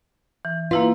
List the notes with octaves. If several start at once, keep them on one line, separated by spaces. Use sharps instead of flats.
E3
A#3 E4 F4 B4